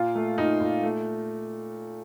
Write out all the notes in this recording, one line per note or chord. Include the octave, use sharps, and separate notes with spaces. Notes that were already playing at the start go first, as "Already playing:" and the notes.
Already playing: A#2 F4
A3
A#2 D#4
A#2
A3